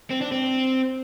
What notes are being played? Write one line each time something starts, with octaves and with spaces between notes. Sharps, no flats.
C4
D4
C4